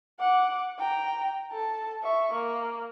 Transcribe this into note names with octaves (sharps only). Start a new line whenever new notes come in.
F#5 D6
G5 A#5
A4 A5
E5 C#6
A#3